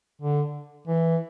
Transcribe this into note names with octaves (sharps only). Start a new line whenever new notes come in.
D3
E3